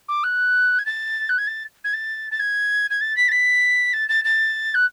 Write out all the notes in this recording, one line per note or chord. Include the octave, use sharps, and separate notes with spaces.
D6
F#6
G#6
A6
F#6
G#6
A6
G#6
A6
A6
G#6
G#6
A6
B6
A6
B6
A6
A6
A6
F#6